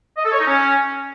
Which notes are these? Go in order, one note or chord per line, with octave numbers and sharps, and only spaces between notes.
D#5
A4
C#5
D#4
C#4